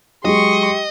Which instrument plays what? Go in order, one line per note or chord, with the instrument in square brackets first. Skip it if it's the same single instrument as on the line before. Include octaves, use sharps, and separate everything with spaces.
[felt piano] F#3 G#3 G#4 [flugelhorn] G4 [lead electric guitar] D#5 [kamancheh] C6 C#6